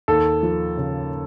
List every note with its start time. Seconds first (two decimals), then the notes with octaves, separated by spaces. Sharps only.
0.08 D#2 A4
0.43 F3
0.77 C#3